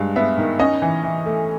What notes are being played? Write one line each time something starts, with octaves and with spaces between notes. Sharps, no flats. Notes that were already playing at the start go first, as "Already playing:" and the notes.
Already playing: G2 G#3 F5
B3 E5
D#3
C#4 D#5
E3
E3
A3